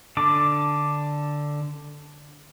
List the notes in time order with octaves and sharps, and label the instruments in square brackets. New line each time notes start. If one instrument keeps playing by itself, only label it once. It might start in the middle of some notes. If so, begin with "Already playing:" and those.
[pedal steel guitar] D3 D4 D6